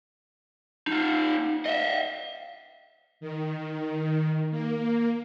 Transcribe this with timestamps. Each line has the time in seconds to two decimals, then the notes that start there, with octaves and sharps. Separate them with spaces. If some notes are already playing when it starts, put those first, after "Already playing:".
0.87 D#4 F4
1.66 D#5 E5
3.20 D#3
4.51 A#3